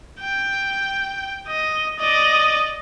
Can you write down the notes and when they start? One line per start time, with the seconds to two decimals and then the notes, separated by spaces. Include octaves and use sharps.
0.21 G5
1.47 D#5
1.99 D5 D#5